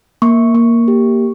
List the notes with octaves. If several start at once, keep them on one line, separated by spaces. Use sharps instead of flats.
A#3 C#6
A#3
G4